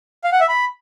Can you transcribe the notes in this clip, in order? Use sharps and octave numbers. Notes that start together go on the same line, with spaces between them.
F5
F#5
E5
B5